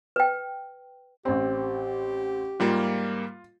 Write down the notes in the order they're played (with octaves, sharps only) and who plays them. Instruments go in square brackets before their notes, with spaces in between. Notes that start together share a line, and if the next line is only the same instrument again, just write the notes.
[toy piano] B4 G5
[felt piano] A1 C4 [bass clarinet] G4
[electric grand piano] G#2 G3 A#3 [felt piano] F4